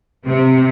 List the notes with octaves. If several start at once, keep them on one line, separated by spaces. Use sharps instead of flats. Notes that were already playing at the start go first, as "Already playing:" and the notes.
C3